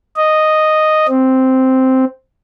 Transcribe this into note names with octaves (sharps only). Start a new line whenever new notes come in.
D#5
C4